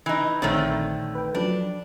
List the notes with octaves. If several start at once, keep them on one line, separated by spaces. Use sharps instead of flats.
E3 D#4
A#1 D3 D#3 A3 C4 C#5
B4 G5
F3 F#3 D4 B4